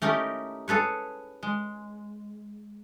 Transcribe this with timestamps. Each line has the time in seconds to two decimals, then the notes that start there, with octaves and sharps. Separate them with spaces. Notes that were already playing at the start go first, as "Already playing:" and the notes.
0.02 A3 C#4 D#4 E4 G4 A#4
0.68 G#4 A4 B4 C#5
1.43 G#3